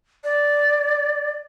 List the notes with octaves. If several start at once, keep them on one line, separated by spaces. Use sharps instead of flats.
D5